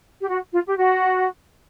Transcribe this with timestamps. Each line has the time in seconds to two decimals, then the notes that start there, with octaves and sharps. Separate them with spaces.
0.21 G4
0.29 F#4
0.52 F4
0.67 G4
0.76 F#4